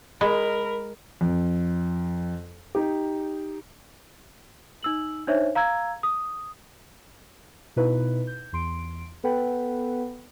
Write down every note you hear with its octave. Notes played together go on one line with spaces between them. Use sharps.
G#3 A#4 B5
F2
D#4 G4
D#4 E6 F#7
D4 D#4 C5 C#5 E5
F5 A#5 E6 G#6
D#6
B2 D#4 E4 B4
G6
E2 C6 D7
B3 A4 B4 F#5 G5 B5